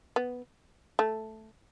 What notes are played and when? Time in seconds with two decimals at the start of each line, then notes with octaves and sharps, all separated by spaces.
0.16 B3
0.99 A3